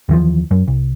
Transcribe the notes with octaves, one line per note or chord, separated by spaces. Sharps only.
D#2 E3 F3
F#2
C2